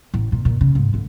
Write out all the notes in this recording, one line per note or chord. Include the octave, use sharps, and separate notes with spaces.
A1
A#2
A#2
C#3
G#2
D2